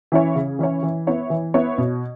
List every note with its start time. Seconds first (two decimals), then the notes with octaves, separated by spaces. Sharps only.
0.12 E3 C#4 E4 C#5
0.35 C#3
0.59 E3 C#4 E4 C#5
0.83 E3
1.07 B3 E4 C#5 E5
1.30 E3
1.54 B3 E4 C#5 E5
1.78 B2